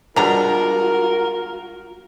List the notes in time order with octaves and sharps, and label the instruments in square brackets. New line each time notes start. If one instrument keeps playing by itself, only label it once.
[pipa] B2 A#5 [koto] G3 G#3 D4 [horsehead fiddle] F4 F#4 [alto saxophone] A#4